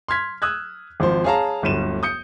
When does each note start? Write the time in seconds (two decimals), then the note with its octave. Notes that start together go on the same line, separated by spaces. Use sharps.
0.08 C6 F6 G#6 B6
0.42 D#6 E6 F#6 G#6
1.00 G#1 F3 C5
1.24 G#4 C#5 F5 A5 A#5
1.62 D1 G1 G2 D#7 E7
2.03 D#6 G6 C#7